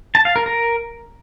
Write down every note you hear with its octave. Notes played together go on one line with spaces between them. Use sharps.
A5
F5
A#4
A#4